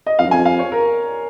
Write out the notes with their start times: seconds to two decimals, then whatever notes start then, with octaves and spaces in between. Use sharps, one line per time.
0.06 D#5
0.19 F2 F5
0.25 F#2
0.31 F2 G#5
0.45 F5
0.59 C#5
0.72 A#4